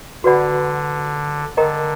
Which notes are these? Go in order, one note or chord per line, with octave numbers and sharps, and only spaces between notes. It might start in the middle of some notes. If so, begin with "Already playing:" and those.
D3 F#4 B4 D5 F#5 B5
D3 A#4 D#5 G5 A#5